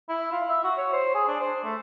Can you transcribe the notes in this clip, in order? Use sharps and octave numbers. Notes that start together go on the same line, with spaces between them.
E4
F4
E5
F#4
C#5
C5
G#4
D4
C5
A3